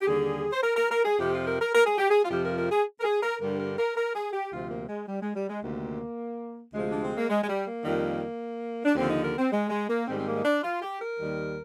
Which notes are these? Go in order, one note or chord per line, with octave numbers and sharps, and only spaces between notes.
G4
D#2 D3 G3 G#4
C5
A#4
A#4
A#4
G#4
F2 C3 F3 G4
F4
A#4
A#4
A#4
G#4
G4
G#4
F4
F2 C3 F3 G4
A#4
A#4
G#4
A#4
G#4
A#4
G2 D3 G3 A#4
A#4
A#4
A#4
G#4
G4
D2 C3 F3 F4
A#3
G#3
G3
G#3
G3
G#3
D2 C3 D#3 A#3
D2 C3 F3 G#3
D4
C4
A#3
G#3
G#3
G3
A#3
F2 D#3 G3
D4
D#2 D3 F3 C4
D#4
A#4
C4
G#3
G#3
A#3
G#2 D#3 G3 C4
C4
A#3
D#4
D4
F4
G4
A#4
D#2 D#3 G3